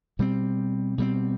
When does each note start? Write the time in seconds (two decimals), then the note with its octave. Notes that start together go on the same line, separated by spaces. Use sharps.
0.19 B2 G3 C4
0.98 B2 G3 C4